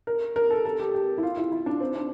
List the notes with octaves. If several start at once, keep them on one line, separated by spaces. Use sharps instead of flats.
A#4
A#4
A4
A4
G4
G4
E4
F4
E4
E4
D4
C4
D4